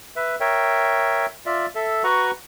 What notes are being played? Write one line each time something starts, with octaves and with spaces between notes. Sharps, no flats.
B4 E5
A#4 C#5 E5 G5
F4 D5 E5
A4 E5
F#4 B4 F#5 A#5 C#6